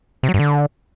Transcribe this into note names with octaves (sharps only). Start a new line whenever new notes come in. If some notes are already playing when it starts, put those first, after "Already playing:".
C3
F#3
G2
D3